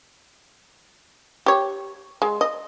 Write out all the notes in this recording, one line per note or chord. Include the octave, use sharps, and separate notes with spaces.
G4 C#5
G#3
D#5